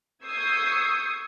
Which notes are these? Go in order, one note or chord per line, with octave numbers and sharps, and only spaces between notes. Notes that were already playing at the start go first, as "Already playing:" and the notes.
C#6 D#6 E6 G6 G#6 C7